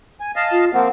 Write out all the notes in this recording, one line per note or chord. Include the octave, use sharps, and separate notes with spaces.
G#5
D#5 F5 A5
F4
F3 A#3 C4 F#5